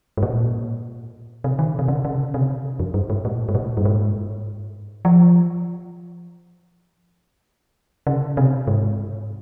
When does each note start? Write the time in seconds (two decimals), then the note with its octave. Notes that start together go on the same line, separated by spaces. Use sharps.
0.17 G#2
0.23 A#2
1.44 C3
1.59 D#3
1.79 C3
1.88 C#3
2.05 C#3
2.34 C3
2.80 F2
2.94 G2
3.10 G#2
3.25 A#2
3.49 G#2
3.55 A#2
3.77 G2
3.85 G#2
5.05 F3
8.07 C#3
8.37 C3
8.67 G#2